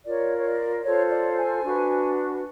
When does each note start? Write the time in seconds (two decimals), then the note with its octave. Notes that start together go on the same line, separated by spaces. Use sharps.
0.05 F4 A#4 C#5 D5
0.37 C#5
0.45 D5
0.84 F4 A4 C5 C#5
1.10 D5
1.37 G#5
1.64 D4 F#4 B4